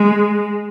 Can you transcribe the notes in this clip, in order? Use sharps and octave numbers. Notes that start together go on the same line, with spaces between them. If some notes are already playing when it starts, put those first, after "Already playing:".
Already playing: G#3